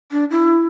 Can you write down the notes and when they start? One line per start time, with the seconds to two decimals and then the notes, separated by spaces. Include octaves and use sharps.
0.12 D4
0.31 E4